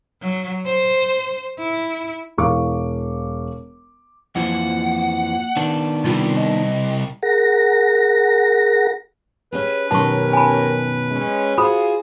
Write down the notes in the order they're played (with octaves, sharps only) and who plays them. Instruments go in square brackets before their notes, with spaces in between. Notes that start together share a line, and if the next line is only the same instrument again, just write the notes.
[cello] F#3
C5
E4
[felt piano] E1 E3 F5 C#6 D6
[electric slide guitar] F2 E3 F3 [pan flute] A#3 [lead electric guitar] F#5
[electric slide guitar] D#3 B3 D4
[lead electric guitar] C2 G3 [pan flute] F4
[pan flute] D#5
[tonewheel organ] G#4 A#4 F#5 A#6
[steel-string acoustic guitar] C#4 G4 G#4 [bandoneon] B4
[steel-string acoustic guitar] F#2 B2 D#3 [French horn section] C#4 G4 A#4 [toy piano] A5 C#6
[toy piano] G#5 A5 B5
[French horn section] G#3 C#4
[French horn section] F4 G#4 [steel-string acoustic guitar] F#4 [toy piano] C5 B5 D#6